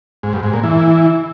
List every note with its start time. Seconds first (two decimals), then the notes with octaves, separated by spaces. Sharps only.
0.23 G#2
0.33 G2
0.43 G#2
0.53 A#2
0.63 E3